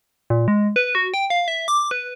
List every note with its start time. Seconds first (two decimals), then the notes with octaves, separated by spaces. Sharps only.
0.30 A#2
0.48 G#3
0.76 B4
0.95 F#4
1.14 G5
1.30 F5
1.48 E5
1.68 D6
1.91 B4